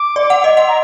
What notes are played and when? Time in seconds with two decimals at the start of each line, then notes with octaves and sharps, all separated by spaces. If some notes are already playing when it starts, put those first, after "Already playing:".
Already playing: D6
0.16 D5
0.30 F#5
0.44 D#5
0.57 F#5 C6
0.68 A#5